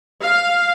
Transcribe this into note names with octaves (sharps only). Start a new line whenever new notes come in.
F5